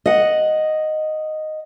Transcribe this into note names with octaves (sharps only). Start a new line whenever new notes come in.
D#5 F#5